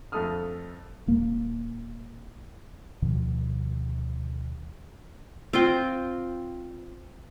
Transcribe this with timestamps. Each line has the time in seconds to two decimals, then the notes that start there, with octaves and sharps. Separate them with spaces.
0.12 F2 A3 A4 D#6 F6
1.07 D#1 A#3
3.02 D2 B2 D#3 F3
5.53 C4 F4 G5